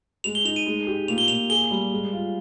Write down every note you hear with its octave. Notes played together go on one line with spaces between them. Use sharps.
G#3 F7
G7
D#4 F7
D#7
G#3
G4
A#2 F7
G7
A#2 F7
G#4 G7
G3
G#3
F4